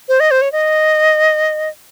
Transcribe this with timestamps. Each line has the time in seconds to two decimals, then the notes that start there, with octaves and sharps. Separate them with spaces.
0.09 C5
0.20 D#5
0.31 C5
0.42 C#5
0.52 D#5